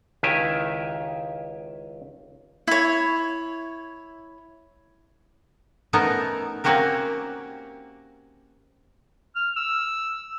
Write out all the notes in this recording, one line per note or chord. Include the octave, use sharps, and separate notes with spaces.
C#2 D#3 E4 G4 E5 G#5
E4 C#5
A3 B3 C#4 D#4 A#4 E5
A#3 C4 C#4 F#4 G4 A#4
F6
E6